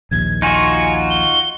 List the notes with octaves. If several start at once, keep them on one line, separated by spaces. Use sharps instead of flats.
A#1 D#2 G#6
D#4 F4 F#4 G#5
G7